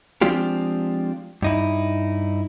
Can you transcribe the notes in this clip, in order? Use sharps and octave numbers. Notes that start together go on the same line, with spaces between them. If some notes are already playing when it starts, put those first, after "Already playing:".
F3 G#3 C4 D4 F4 G4
G2 D#4 E4